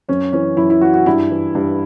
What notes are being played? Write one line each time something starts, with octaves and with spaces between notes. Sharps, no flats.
F#2 C#4
E3 C#4
F#2 E4
E4
E3 F#4
F#4
G2 E4
E3
G2